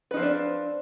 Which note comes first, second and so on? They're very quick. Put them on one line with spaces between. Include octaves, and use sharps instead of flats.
B4 D#4 F3 C4 D4